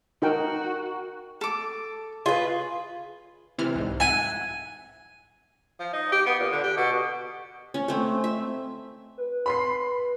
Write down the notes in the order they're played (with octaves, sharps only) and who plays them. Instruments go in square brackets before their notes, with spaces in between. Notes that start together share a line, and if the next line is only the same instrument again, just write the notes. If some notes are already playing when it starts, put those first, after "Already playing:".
[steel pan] D#4 A#4 G5 [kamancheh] F#4
[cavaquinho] A4 D6
[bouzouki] F4 B4 [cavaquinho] G#4
[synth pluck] C3 E3 F6
C2 G#2
[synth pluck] E5 F#5 [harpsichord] G#5
[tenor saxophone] F3
D#4
G4
B3
A#2
D3
G4
B2
[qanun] C#4
A3 C4
E5
[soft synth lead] B4
[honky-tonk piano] B5 C6 C7